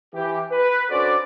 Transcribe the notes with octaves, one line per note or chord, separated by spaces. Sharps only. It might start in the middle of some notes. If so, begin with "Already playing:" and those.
E3 G4
B4
C#4 D4 F#4 A4 C5 D5